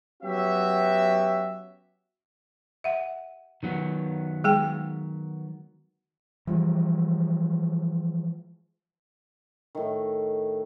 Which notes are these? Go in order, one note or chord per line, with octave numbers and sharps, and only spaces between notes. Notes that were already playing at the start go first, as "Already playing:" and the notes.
F#3 B3 C#4 F#4 G4 E5
E5 F#5
D#3 F#3 B3
G#3 G#4 G5
E3 F3 G3 G#3
A2 D#3